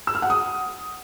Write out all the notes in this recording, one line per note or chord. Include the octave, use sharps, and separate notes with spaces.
E6
F6
F#5
D#6